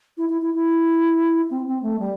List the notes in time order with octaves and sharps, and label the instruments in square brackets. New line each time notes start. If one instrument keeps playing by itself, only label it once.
[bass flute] E4
E4
E4
E4
C4
C4
A3
G3